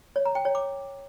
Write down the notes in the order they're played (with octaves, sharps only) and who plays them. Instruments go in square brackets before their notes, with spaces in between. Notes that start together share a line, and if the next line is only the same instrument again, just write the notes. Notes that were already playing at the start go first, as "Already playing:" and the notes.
[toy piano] C#5
A#5
G5
C#5
D6